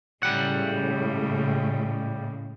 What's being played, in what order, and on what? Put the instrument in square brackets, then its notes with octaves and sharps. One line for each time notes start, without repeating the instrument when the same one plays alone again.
[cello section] A2 C#3 G#3 [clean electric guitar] G3 F#5